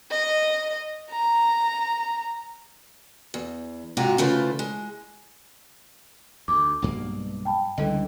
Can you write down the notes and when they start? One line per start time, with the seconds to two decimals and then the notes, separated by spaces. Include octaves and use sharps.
0.11 D#5
1.11 A#5
3.34 E2
3.97 G#2 C3 F4 F#4 A#5
4.18 C#3 E3 A3 F4 B4 C5
4.59 G#3
6.48 D2 D6
6.82 B1 G2 A#3
7.45 G5 A5 B5
7.78 C#2 D3 E3 G3 A4 D#5